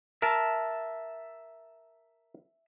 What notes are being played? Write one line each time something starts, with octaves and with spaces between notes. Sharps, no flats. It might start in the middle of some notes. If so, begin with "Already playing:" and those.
A#4 E5 A5